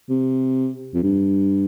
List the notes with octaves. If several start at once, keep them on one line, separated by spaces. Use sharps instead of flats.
C3
F2
G2